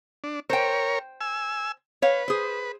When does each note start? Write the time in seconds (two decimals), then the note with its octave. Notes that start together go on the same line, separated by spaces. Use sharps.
0.24 D4
0.50 A#4 C5 C#5 G5
1.21 G#5 E6
2.02 B4 C#5 F5
2.28 G#4 C5